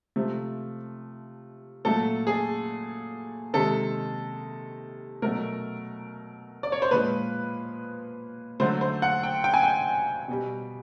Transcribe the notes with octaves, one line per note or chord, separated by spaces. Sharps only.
C3 F3 A3
A#2 F#3 A3 A4
G#4
C3 D#3 G#3 A4
B2 F#3 A3 A#4
D5
C#5
C5
A#2 F3 G#3 B4
D3 F#3 A3 C5
C5
F#5
G5
G5
G#5
G5
B2 G3